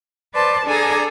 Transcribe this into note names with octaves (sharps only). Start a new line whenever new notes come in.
B4 C5 D5 A5
D4 G#4 A4 D5 G#5 A#5